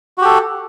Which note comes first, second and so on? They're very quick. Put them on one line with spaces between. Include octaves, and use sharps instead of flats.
F#4 G4 A4